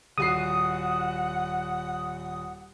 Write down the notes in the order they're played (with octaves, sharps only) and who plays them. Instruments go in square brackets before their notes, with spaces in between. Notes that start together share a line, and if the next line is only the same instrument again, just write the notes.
[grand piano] D#1 F#4 C7 [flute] F#5 [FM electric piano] D#6